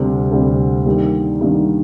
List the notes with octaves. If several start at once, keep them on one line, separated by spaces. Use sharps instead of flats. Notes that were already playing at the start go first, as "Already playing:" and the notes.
Already playing: D2 C3 G3
D2 C3 G3
G2 D#3 A#3 D#4 G4
G2 D#3 A#3 D#4 G4